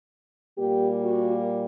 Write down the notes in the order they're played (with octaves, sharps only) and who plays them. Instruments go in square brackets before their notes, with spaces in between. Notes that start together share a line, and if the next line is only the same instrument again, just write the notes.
[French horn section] A#2 G3 A#3 G4
F#4